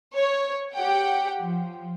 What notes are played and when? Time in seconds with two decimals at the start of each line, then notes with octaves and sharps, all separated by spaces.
0.15 C#5
0.74 G4 F#5 G5
1.41 F3